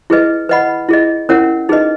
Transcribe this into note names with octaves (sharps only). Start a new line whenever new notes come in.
E4 G#4 B4 D#5
B4 D#5 F#5 B5
E4 G#4 D#5
C#4 E4 A#4 C#5 F#5
D#4 G#4 B4 D#5